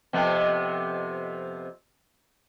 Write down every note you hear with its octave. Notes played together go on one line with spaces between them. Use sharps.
F2 C3 B3